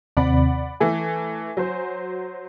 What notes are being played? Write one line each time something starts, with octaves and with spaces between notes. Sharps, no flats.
D#2 C3 C4 D5 F#5 B5
E3 A3 G#5
F#3 C5